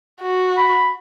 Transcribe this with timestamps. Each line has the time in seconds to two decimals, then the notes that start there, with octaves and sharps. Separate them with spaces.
0.21 F#4
0.58 B5